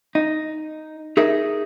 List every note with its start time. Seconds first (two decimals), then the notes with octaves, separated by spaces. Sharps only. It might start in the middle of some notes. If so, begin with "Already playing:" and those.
0.15 D#4
1.17 D#4 G#4 A#4 E5